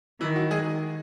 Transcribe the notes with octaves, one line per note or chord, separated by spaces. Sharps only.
D#3 E3 E4
F#3 F#4
G#3 G#4